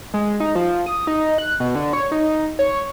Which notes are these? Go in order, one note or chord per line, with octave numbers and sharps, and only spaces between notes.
G#3
D#4
F3
D#6
D#4
F#6
B2
D3
C#5
D#4
C#5